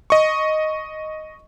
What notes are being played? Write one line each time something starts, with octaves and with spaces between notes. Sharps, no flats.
D#5 C#6